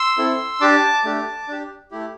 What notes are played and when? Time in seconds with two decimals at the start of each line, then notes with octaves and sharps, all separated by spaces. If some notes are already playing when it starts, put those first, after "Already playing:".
Already playing: C6 E6
0.18 C4 E4 A4
0.60 D4 G4 A5 D6
1.04 A3 D4 G4
1.48 D4 G4
1.91 A3 E4 G4